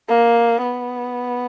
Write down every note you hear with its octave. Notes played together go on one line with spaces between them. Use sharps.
A#3
B3